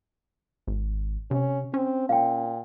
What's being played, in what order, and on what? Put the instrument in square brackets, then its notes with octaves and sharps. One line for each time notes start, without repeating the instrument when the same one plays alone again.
[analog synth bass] G#1
[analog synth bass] C3 [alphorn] C#4
[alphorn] C4 [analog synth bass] C#4
[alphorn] A#2 [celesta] F5 G5